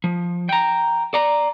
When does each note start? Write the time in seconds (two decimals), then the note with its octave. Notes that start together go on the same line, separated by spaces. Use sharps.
0.04 F3
0.49 G5 A#5
1.14 D5 A#5